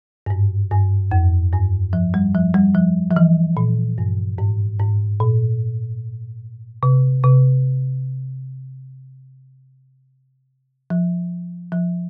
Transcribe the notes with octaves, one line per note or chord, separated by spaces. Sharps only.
G2
G#2
G2
F2
G2
F3
G3
F3
G3
F3
F3
E3
A#2
G2
G#2
G#2
A#2
C3
C3
F3
F3